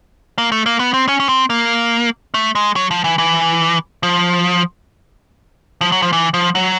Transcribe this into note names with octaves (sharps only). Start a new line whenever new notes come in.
A#3
A3
A#3
B3
C4
C#4
C#4
C4
A#3
A3
G#3
F#3
F3
E3
E3
F3
F3
F#3
F3
E3
F3
F#3